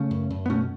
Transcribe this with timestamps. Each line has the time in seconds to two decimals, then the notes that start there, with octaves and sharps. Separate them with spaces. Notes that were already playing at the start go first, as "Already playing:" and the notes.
Already playing: C#3 A3 C#4
0.11 F#2
0.30 F#2
0.46 B3
0.50 B2 A3 C#4